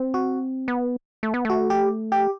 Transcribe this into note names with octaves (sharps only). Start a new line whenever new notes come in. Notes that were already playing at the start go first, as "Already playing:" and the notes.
Already playing: C4
F#4
B3
A3
B3
A3 F#4
G4
G4